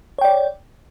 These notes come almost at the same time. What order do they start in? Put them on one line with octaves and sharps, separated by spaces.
C#5 G5 D5